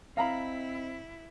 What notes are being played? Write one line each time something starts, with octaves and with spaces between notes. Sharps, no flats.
C4 E4 D#5 F5 A#5 B5